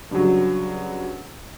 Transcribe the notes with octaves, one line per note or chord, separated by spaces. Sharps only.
G2 C#3 F#3